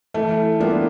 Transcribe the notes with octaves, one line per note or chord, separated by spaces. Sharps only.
E3 A3
G3 A#3 B3 D4 F4